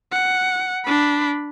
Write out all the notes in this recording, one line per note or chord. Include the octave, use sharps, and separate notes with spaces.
F#5
D4 B5